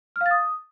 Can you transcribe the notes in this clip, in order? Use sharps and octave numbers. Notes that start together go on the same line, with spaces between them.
F6
F5
A6
D#6